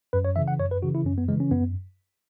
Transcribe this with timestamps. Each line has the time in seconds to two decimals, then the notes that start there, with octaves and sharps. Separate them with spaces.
0.13 F#2 B4
0.25 C#5
0.36 C#3 E3 E5
0.48 F#5
0.59 F#2 C#5
0.71 B4
0.82 C#3 E3 F#4
0.95 E4
1.05 F#2 C#4
1.18 B3
1.28 C#3 E3 G#3
1.40 C#4
1.51 F#2 B3